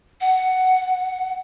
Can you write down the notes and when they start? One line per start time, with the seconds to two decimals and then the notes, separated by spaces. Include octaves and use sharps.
0.20 F#5